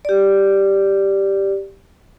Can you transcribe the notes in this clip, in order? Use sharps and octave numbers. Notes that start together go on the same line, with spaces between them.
G4 D5